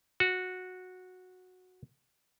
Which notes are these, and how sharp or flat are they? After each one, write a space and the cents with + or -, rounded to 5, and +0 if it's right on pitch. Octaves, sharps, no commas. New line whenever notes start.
F#4 -10